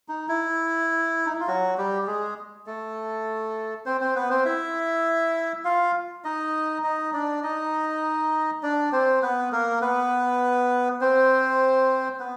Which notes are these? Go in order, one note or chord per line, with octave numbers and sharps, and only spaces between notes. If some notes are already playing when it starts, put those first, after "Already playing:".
D#4
E4
D#4
E4
F4
F#3 F#4
G3 G4
G4
G#3 G#4
A3 A4
C4 C5
C4 C5
B3 B4
C4 C5
E4 E5
F4 F5
D#4 D#5
D#4 D#5
D4 D5
D#4 D#5
D4 D5
C4 C5
B3 B4
A#3 A#4
B3 B4
C4 C5
B3 B4